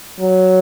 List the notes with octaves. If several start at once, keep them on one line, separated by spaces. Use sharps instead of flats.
F#3